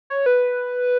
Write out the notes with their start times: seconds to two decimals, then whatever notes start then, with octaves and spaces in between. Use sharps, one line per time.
0.10 C#5
0.26 B4